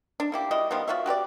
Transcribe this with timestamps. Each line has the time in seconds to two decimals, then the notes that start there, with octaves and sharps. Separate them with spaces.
0.20 D4
0.32 A#3 E4 G4
0.51 G3 E4 F#4 D#5
0.71 D#3 F3 G3 B3
0.88 F4 F#4 C#5 E5
1.06 F#4 G4 B4 D5